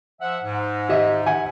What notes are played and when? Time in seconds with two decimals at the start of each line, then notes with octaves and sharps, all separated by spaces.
0.21 F3 E5 F#5
0.44 G#2
0.89 G4 D#5 E5
1.26 F#5 G#5